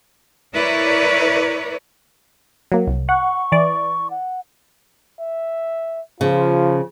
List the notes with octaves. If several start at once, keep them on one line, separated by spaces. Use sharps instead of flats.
E4 A#4 B4 C#5 D5
F#3 A#3
C2
F#5 C#6
E3 D5
F#5
E5
C#3 F3 F4